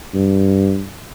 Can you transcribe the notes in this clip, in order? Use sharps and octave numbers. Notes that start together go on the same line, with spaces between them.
G2